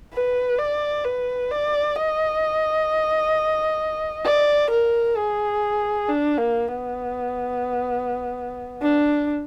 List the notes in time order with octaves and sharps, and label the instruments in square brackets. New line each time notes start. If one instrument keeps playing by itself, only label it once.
[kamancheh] B4
D5
B4
D5
D#5
D5
A#4
G#4
D4
A#3
B3
D4